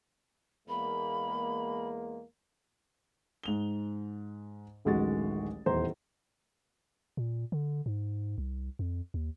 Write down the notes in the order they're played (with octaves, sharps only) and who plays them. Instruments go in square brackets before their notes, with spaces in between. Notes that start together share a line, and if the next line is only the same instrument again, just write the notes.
[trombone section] E2 G#3 A#3 [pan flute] B5
[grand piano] G#2 F7 G7
D1 A1 D#3 G#3 F#4 A6
D#1 E2 E3 C5 A#5 C6
[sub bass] A#2
D3
G#2
C2
F2
D#2